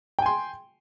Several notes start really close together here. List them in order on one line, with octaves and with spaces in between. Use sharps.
G5 G#5 C6